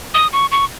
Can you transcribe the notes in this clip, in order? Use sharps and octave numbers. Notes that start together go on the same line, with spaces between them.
D#6
C#6
C#6